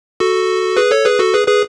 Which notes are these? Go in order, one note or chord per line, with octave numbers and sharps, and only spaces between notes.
F#4 A4
G#4 B4
A4 C#5
G#4 B4
F#4 A4
G#4 B4
G#4 B4